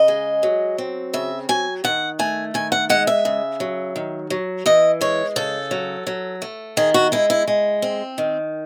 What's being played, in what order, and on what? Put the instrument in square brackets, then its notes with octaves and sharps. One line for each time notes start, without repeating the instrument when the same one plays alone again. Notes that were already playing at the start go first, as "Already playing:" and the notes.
Already playing: [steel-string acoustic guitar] C#3 D#5
G#3
F#3
C4
C#3 E5
F#3 G#5
D#3 F#5
A3 G#5
D#3 G#5
F#5
G#3 F#5
E5
C#3
F#3
D#3
F#3
E3 D#5
G#3 C#5
C#3 A4
F#3
F#3
A3
D#3 G#4
F#4
G#3 E4
E4
G#3
C4
D#3